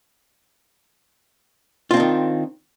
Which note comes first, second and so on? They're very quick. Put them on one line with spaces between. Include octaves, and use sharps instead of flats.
F4 C4 D4 D#3